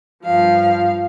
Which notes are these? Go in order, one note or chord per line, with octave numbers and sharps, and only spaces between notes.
G2 F3 F5